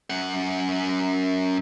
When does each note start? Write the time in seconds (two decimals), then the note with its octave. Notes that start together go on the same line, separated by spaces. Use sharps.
0.10 F#2 F#5